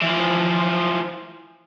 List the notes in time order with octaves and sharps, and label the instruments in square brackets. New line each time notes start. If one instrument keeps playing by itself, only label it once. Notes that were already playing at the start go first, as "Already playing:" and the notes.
[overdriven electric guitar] E3 F3